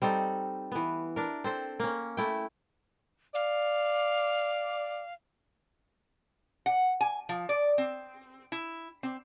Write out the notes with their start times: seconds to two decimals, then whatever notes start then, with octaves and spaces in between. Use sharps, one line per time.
0.02 G3 C4 D#4 A4
0.72 E3 B3
1.16 D4 A#4
1.44 C4 A4 C5
1.80 A#3 C#4
2.17 A3 E4 G5
3.35 D5 F5
6.66 F#5
7.01 G#5
7.29 F3
7.49 D5
7.78 C4
8.52 E4
9.03 C4